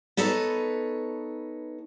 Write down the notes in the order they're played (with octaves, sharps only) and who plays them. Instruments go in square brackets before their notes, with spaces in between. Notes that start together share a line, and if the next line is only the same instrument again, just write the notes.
[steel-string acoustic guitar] B3 D#4 A4 B4 C#5